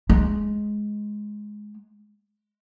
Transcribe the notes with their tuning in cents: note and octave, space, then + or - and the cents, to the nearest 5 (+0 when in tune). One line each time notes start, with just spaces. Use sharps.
G#3 +10